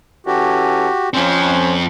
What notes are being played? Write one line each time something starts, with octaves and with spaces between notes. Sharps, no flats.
E3 C#4 F#4 G4 A4
F2 C4 C#4 C5